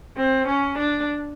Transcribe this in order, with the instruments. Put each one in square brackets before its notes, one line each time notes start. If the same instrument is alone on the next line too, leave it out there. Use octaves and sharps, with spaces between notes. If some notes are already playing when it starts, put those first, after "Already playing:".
[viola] C4
C#4
D4